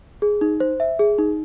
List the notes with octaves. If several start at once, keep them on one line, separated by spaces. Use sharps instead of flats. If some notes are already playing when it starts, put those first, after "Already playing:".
G#4
D#4
C5
E5
G#4
D#4